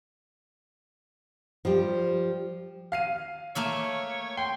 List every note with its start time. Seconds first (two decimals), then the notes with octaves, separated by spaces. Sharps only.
1.65 F3 G3 G4
2.92 F5 C7 D#7
3.55 A3 A#3 C#5 E5
4.37 G5 C6